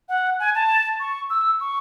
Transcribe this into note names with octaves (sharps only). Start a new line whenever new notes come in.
F#5
G#5
A5
C#6
E6
C#6